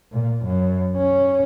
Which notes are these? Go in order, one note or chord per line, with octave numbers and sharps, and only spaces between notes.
A#2
F#2
C#4